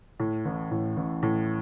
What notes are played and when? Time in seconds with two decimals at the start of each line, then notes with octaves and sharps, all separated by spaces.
0.20 A2
0.45 A1
0.71 A2
0.97 A1
1.23 A2